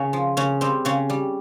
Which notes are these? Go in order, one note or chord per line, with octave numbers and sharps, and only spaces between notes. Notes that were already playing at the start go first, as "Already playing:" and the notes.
Already playing: C#3 C#4
F3
C#3 C#4
G3 C4
C#3 C#4
G3